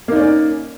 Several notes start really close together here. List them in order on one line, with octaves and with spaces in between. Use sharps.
A#3 D#4 D5 C#4